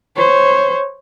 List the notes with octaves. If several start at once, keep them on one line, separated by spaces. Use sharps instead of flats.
C5 C#5